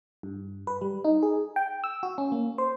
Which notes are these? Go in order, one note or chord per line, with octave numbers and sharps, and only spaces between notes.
G2
B4
G3
D#4
G#4
G5
E6
F#4
C#4
A#3
C5